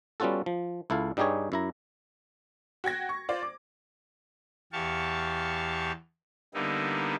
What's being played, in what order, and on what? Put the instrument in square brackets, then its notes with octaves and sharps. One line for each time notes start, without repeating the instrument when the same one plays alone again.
[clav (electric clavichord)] G3 B3 C#4 F4 F#4 A4
F3
C#2 E4 A4 F5
G2 G3 D#4 G4 G#4 C#5
F#2 E4 A#5
[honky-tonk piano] F#4 G5 G#6 A#6
C#6
F4 C5 D5
D6
[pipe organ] E2 G4 F5 A5 C#6
D3 G3 A#3 B3 D#4 E4